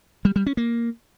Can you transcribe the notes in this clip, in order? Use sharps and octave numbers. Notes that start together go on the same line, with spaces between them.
G3
G3
C#4
A#3